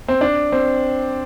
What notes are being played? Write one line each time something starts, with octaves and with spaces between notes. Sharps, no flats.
C4
D4
C4